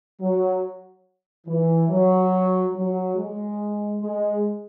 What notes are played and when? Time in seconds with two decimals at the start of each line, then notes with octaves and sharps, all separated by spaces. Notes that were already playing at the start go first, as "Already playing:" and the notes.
0.21 F#3
1.47 E3
1.90 F#3
2.75 F#3
3.16 G#3
4.01 G#3